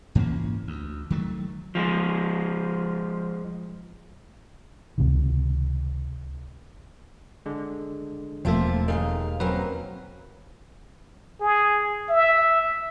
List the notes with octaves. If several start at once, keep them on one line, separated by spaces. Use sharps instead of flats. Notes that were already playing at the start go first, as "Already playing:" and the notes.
G#2 E3 A#3 C#4
D2
D#3 F#3 A3
F3 G#3
C#2 C3 D#3
D3 G#3
E1 F3 A3 A#3 C4 F4 E5
D#2 E3 D#4 G#4 F5
F#3 A#3 C4 C#4 B4
G#4
E5